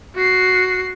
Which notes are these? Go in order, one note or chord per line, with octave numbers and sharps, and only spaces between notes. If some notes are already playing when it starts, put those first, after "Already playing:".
F#4 C7